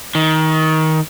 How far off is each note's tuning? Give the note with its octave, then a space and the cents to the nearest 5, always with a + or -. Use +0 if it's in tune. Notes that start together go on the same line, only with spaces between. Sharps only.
D#3 +20